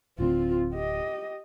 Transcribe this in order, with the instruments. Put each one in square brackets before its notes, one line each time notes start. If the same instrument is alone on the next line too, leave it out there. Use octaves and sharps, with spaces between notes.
[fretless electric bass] D1 A2 D3 [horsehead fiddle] C4 F4
[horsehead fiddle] G4 D#5